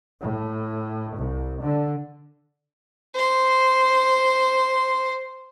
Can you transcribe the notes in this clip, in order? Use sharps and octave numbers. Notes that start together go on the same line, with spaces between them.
A2
C2
D3
C5 C6